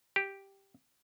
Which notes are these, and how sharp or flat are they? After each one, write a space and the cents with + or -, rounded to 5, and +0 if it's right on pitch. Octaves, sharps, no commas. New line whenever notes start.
G4 +0